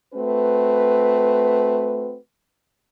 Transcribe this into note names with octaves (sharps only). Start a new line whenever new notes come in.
A3 C4 F#4 B4